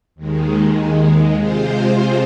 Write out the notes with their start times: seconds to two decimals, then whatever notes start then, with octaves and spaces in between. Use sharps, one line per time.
0.15 D#2 D#3 G#3
1.36 C3 G#3 F4 C5